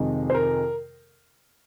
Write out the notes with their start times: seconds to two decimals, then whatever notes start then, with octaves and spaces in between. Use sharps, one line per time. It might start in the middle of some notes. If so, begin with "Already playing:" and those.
Already playing: F2 C3 D#3 G#3
0.30 C5
0.34 A#4